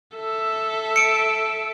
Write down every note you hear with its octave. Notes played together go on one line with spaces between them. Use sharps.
A4 E5
C#7 D7